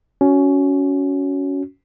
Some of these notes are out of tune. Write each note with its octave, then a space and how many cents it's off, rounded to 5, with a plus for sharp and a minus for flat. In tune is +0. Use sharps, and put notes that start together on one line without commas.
C#4 +15 F#4 +0